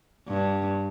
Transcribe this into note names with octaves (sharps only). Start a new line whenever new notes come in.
G2